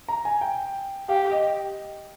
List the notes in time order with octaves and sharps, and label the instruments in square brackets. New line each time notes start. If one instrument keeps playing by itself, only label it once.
[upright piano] A#5
G#5
G5
[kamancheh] G4 [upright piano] F5
[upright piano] D#5